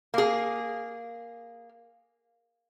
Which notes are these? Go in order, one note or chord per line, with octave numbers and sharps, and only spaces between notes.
A#3 G#4